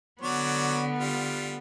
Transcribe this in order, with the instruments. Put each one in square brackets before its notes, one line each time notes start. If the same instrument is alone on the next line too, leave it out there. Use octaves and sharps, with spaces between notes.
[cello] D3 B3 [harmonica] F#3 C#5 D5
[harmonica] G3 F4